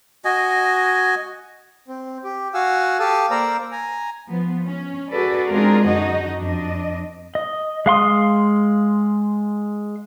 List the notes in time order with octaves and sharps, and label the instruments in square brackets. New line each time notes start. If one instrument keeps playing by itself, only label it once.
[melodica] F#4 D#5 G#5
[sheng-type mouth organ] C4
G4
F#4 F5 F#5 G#5 E6
G4 A4 F5 A5 D#6 E6
A#3 A#4 C5 D5 A#5 E6
G#5 A#5
[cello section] F3 B3
C#4
F#4 G#4 A4 B4 D5
G#3 C4 D4 F4 G#4 A#4
F#2 D3 D#4 F#4 D#5
F2 D4 D#5
[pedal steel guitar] D#5
G#3 F5 C6 D#6